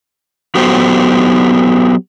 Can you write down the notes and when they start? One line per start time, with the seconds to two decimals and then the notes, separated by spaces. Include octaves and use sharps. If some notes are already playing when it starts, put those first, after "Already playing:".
0.55 F#3 B3 F#4 G4 A4 C5